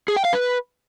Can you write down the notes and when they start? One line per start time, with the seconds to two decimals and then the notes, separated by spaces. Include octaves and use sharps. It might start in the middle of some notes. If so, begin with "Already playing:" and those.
0.08 G#4
0.16 G5
0.25 F5
0.33 B4